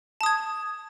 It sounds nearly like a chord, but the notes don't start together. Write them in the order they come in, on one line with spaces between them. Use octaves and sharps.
A5 D#6 G#6